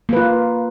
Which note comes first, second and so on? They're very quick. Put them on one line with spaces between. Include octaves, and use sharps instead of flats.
A#3 B4 F4